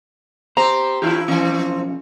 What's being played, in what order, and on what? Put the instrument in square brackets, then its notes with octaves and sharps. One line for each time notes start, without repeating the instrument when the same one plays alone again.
[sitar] C4 G4 [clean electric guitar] C5 [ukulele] A#5
[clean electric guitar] D3 F4 G4 [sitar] E3 E4
[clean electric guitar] B1 F3 C#4 [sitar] E3 C4